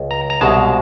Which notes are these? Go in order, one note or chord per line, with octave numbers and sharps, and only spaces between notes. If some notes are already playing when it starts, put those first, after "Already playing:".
Already playing: C#2
A#5
A#5
C2 B2 G#3 A5